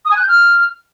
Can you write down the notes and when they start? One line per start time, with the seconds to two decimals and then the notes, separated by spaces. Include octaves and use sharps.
0.05 D#6
0.11 G#5
0.17 F#6
0.22 G6
0.28 F6